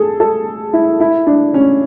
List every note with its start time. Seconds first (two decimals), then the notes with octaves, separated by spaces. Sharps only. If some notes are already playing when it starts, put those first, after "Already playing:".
Already playing: G#4 A4
0.20 A4
0.73 E4
1.00 E4
1.27 D4
1.54 C#4